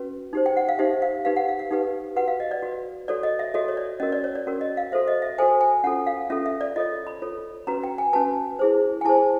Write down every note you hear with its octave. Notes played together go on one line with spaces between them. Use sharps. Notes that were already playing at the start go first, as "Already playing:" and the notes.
Already playing: C#4 F#4 B4
D#4 G4 C5
G5
F#5
F5
D#4 G4 C5 E5
F5
D#4 G4 B4 F5
F#5
F5
F5
D#4 G4 B4
F#4 B4 F#5
F5
D#5
D5
F#4 B4
F#4 A4 C#5 D5
D#5
E5
F#4 A4 C#5 D#5
C#5
D5
C#4 F#4 A#4 D#5
D5
C#5
D5
C#4 F#4 A#4
D#5
F5
F#4 A4 C5 E5
D#5
E5
F#4 A4 C5 G#5
G#5
C#4 F4 A4 F#5
F5
C#4 F4 A4 E5
E5
D5
F4 A4 C#5 D#5
B5
F4 A4 C#5
C#4 F#4 B4 A#5
G5
G#5
C#4 F#4 B4 A5
E4 G#4 C5
G#5
E4 G#4 C5 A5